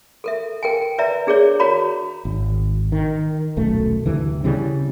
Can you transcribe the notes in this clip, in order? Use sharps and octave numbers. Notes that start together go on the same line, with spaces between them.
A4 A#4 E5
A#4 G5 G#5
B4 D5 E5 A#5
D4 G#4 A#4 C#5 D5
F#4 A#4 C#5 D5 A#5 B5
G#1
D#3
D#1 B1 F#2 A3
D2 G2 C3 E3
C#3 E3 G3 C4